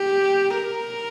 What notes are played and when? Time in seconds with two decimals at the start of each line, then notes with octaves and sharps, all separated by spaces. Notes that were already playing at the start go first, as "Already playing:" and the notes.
Already playing: G4
0.55 A#4